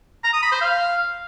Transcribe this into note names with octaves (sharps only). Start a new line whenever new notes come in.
A#5
D#6
B5
C5
F5